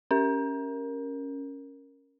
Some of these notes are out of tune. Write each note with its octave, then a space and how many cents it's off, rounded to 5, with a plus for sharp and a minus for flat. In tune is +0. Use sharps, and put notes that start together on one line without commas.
C#4 +0 A#4 +0